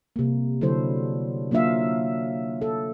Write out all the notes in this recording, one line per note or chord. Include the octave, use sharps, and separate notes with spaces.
C3 A#3
D3 F#3 E4 A4 C5
F#3 A#3 D4 F4 E5 F5
A4